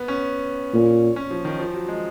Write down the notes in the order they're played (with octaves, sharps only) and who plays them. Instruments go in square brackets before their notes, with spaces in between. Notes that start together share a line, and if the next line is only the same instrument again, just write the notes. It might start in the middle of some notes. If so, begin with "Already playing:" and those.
Already playing: [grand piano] B3
C#4
[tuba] A#2
[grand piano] C#4
F3
D#3
F3
F#3
G#3